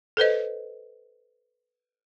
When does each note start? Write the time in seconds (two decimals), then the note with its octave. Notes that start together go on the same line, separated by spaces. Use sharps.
0.17 A4 B4 C5 D#5